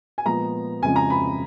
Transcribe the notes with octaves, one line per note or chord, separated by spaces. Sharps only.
G#5
A#2 F3 G#3 B3 A#5
F2 C#3 F3 G#3 C#4 G#5
A#5
B5